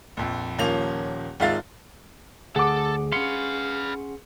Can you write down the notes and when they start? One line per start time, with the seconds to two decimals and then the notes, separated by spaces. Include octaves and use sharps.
0.17 A#1 F2
0.59 D#1 F3 A#3 C#4 F7
1.40 G#1 G#3 F4 E5 F5 A6
2.56 D2 G#4 A4 F#5 D6
3.12 C#4 B4 F5 F#5 C6 C#7